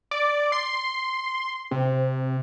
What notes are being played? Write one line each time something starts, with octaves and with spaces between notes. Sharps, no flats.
D5
C6
C3